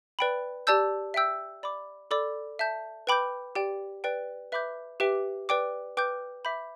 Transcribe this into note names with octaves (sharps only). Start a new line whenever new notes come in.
B4 D5 G5 B5
G4 D5 A5 E6 G6
E5 G5 E6 G6
D5 B5 D6
A4 D5 B5 D6
E5 A5 G6
B4 G5 B5 D6 G6
G4 D5 G5
B4 D5 G5
B4 E5 B5 D6 G6
G4 B4 E5 G5 D6
B4 D5 G5 D6
B4 G5 D6 G6
E5 B5 D6 G6